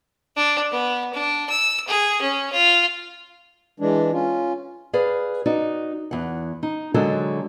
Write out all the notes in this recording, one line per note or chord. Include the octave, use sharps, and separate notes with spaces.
D4
B3
D4
E6
G#4
C#4
F4
E3 G#3 D4
C#4 F4
G#4 B4 D5 F5
D#4 F#4 D5
E2 F#5
D#4
D3 F#3 G#3 F#4 A4 A#4